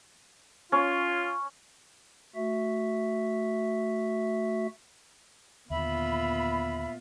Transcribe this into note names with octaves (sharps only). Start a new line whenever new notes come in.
C#4 F4
A3 F#4 E5
D#2 A#2 D3 B3 F4 E5 B5